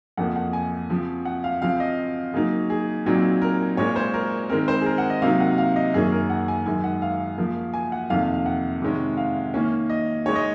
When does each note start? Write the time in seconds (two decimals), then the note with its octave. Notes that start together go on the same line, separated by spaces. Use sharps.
0.17 F2 C#3 F3 A#3 F#5
0.36 F#5
0.53 G#5
0.90 C#3 F3 C4
1.25 F#5
1.44 F5
1.62 C#3 F3 C4 F5
1.80 D#5
2.34 C#3 F#3 A#3 D#4
2.70 G#4
3.06 A#2 F#3 C4 D#4
3.42 A#4
3.77 A#2 G#3 C#4 C#5
3.96 C5
4.14 A#4
4.49 D#3 G#3 C4 A#4
4.68 C5
4.81 G#4
4.86 A#4
4.98 F#5
5.10 D#5
5.22 C3 F#3 A#3 D#4 F5
5.40 F#5
5.58 F5
5.76 D#5
5.94 F#2 D#3 A#3 C#4 G#4
6.12 A#4
6.30 F#5
6.48 G#5
6.66 F#2 D#3 G#3 G#5
6.84 F#5
7.02 F5
7.38 C#3 F3 A#3
7.74 G#5
7.92 F#5
8.10 F2 C3 D#3 A#3 F5
8.22 F5
8.34 F5
8.46 F#5
8.82 C3 D#3 G#3 C#4
9.17 F5
9.54 D#3 A#3 C#4
9.90 D#5
10.26 C#3 G#3 D#4 C#5
10.35 D#5